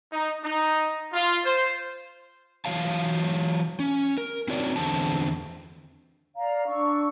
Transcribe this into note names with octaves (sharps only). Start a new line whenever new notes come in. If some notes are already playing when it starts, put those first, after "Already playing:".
D#4
D#4
F4
C5
E3 F#3 C#5 F5 A5
C#4
A#4
C4 D#4 F#4 C#5 D5
E2 D3 C4 A5
D5 F5 A#5
D4 C#6 E6